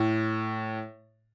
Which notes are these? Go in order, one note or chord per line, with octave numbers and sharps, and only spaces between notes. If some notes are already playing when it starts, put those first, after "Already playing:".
Already playing: A2